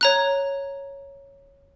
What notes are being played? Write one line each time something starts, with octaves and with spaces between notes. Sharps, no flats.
C#5 A#5 F#6